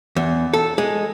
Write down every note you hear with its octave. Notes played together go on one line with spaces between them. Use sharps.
E2
A4
G#3